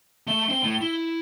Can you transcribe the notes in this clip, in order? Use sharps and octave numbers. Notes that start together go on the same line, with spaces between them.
A3 E5 G7
C4 C5
A2
E4